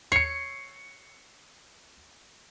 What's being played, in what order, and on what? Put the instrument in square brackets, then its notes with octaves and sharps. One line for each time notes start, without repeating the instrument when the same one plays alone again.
[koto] C#5 [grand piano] C7 C#7